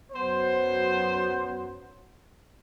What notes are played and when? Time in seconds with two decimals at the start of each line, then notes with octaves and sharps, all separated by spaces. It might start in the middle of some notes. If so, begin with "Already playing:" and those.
0.11 F#2 F#3 B3 C5